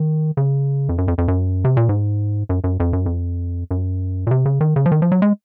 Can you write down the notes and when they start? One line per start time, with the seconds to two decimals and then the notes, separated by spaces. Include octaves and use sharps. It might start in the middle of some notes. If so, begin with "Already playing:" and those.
Already playing: D#3
0.37 C#3
0.89 F2
0.98 F#2
1.08 F2
1.18 F2
1.28 F#2
1.64 C3
1.77 A#2
1.89 G#2
2.49 F#2
2.64 F#2
2.80 F2
2.93 F#2
3.06 F2
3.71 F#2
4.27 A#2
4.31 C3
4.45 C#3
4.61 D#3
4.76 C#3
4.86 F3
4.92 D#3
5.02 F3
5.12 F#3
5.22 G#3